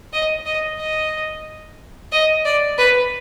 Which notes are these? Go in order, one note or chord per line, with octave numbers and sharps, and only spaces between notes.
D#5
D#5
D#5
D#5
D5
B4